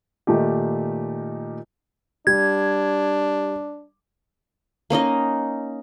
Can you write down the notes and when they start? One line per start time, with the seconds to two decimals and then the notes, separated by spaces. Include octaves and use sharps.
0.27 A#2 D#3 A3 D#4 G4
2.27 G3 D4 G#6
4.90 A#3 C#4 D#4 D#5